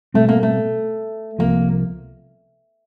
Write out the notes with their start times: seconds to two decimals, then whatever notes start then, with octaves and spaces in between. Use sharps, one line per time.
0.14 B2 G3 A3 C4
0.29 A#3
0.43 A3
1.39 C2 C3 F3 A#3